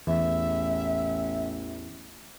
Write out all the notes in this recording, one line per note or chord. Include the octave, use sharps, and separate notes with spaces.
A1 E2 E5